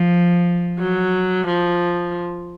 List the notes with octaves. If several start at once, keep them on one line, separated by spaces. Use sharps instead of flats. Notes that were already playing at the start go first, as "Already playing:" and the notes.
Already playing: F3
F#3
F3